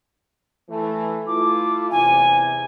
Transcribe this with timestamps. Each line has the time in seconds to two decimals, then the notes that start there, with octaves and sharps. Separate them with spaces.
0.69 E3 A3
1.27 A3 E4 F4 D6
1.91 E2 C3 G#5